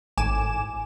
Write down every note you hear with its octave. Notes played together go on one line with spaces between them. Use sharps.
G#1 A2 G#5 D6 E7